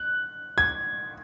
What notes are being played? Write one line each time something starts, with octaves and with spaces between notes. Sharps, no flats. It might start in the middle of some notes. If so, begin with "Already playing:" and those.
Already playing: F#6
G#6